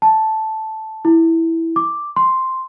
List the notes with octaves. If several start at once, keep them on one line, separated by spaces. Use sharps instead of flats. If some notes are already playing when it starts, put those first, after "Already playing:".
A5
E4
D6
C6